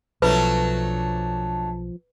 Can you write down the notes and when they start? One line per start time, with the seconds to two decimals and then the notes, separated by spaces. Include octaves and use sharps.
0.22 B1 F3 F#3 A3 D4 B4